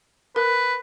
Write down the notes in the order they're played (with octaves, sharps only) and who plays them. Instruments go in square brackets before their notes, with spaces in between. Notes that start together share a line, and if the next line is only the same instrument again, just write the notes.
[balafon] A#4 [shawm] B4